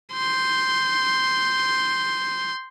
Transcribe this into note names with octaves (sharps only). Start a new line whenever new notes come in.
C6 G6